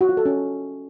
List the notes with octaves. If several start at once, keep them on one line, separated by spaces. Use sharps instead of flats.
F#4
F4
A4
C#4